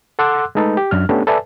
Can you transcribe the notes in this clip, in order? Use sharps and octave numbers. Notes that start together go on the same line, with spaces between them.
A4 F#5 C6 D6 E6 F#6
G#3 A3 D#4 A4 B4
G4
F#2 D4 F6
A3 B3 C#4 D4 G4 A4
A4 B4 D5 E5 G#5 A5